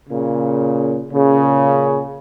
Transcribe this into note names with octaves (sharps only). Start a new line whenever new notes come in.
A#2 C#3
A#2 C#3